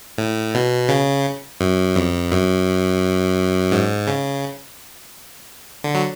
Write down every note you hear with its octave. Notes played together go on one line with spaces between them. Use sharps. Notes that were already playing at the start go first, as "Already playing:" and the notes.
A2
B2
C#3
F#2
F2
F#2
G#2
C#3
D3
F#3